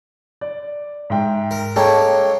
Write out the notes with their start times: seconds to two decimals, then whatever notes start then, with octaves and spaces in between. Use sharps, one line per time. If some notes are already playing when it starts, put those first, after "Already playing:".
0.41 D5
1.10 G#2 E5 G5
1.51 A#4
1.76 G#3 A#3 C#4 A4 G5 A#5